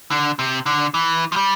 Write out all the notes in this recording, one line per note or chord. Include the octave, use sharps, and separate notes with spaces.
D3
C3
D3
E3
F3
G3